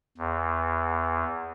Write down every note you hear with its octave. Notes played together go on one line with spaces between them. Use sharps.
E2